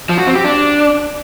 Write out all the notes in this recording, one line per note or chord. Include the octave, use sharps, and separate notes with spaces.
F3
F#4
C4
G4
D4